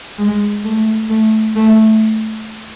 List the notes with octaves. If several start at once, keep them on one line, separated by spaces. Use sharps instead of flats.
G#3
A3
A3
A3